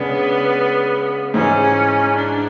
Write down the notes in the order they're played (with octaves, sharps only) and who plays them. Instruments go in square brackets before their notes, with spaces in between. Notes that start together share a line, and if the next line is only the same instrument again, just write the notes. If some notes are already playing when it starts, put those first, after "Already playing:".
Already playing: [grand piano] C#3 G#3 D4 [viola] B3
[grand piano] G#2 E3 G#3 [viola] C#4
[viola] D4